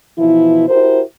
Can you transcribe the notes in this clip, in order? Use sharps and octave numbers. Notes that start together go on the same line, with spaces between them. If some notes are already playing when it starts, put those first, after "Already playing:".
B2 E3 F3 E4
E4 F#4 G4 A#4 C5